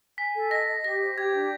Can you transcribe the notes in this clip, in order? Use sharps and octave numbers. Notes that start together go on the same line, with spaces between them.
G#5 B6
A4
D#5 A#6
D#5
G4 A#6
C5
G4 G#6
D4